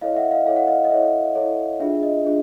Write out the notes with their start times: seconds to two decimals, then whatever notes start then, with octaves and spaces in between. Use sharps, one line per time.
0.01 E4 A4 C#5 D#5 F5
0.16 E5 F#5
0.31 D#5 F5
0.45 E4 A4 C#5 F5
0.56 F#5
0.67 D#5 F5
0.85 D#5
0.90 E4 A4 C#5 E5
1.35 E4 A4 C#5
1.80 D4 F4 G#4 E5
2.03 D#5
2.25 D4 F4 G#4